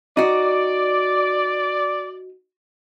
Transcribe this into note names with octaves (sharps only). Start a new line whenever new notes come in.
D#4 F#4 D5